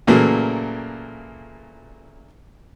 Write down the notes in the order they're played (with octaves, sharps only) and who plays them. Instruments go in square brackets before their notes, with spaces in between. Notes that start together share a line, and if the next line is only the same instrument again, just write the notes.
[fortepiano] A#2 C#3 E3 F#3 A3 A#3